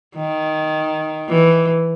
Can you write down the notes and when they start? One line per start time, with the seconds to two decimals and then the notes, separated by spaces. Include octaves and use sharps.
0.16 D#3
1.29 E3